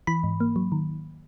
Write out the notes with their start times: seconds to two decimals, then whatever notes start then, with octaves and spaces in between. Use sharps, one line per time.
0.07 E3 B5
0.24 G#2
0.40 A#3
0.56 F#3
0.72 D#3